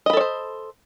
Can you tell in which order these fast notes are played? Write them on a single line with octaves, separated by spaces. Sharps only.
D#5 B5 A4 C#5 C5